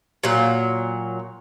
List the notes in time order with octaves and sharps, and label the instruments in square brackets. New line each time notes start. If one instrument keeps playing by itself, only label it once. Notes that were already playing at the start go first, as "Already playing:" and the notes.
[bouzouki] A#2 F#3